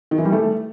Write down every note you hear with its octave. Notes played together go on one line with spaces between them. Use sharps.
D#3
E3
G3
A3